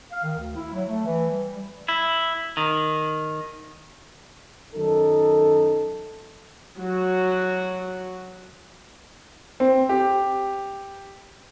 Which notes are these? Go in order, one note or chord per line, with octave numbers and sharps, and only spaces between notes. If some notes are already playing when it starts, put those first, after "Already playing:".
F5
D#3
D2
E4
F#3
A3
E3
G3
E4
D#3
F#2 D#3 D#4 A4
F#3 F#4
C4
G4